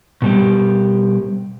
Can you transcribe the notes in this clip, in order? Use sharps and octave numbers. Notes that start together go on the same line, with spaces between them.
B2 G3 G4